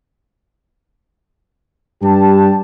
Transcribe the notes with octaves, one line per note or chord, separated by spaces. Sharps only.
G2 G4 A5